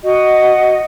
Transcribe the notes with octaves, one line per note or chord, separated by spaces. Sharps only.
F#4 D#5 F#5